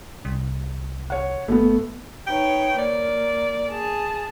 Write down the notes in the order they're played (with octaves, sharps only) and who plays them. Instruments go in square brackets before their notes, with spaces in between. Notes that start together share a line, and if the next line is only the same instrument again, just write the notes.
[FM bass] C2
[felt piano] C#5 F#5
[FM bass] G#1 [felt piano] A3 B3
[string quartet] D#4 B4 C#5 [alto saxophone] G5
[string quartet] A#3 [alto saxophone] D5
[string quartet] G#4 A5